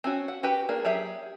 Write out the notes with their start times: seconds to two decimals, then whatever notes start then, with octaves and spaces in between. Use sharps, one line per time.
0.04 C4 C#4 F#4
0.28 F#5
0.43 F#4 G4 B4 G5
0.69 A#3 D4 G#4
0.85 F#3 G4 G#4 E5